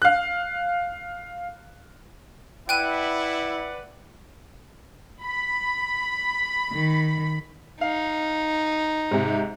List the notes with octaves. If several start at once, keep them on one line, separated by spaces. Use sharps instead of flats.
F5 F#6
E4 B4 D5 F#5 G5 F#6 D#7
B5
D#3
D#4 F5
G#2 C3